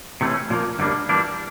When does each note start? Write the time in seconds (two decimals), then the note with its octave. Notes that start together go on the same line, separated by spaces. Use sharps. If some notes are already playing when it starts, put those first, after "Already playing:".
0.21 C3 E3 A3 C#4
0.50 A#2 F3 A#3
0.79 F#2 D3 G3 A#3 D4
1.09 E3 G3 A#3 D4